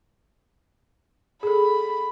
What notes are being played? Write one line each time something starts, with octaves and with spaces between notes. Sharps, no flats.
G#4 A4 B5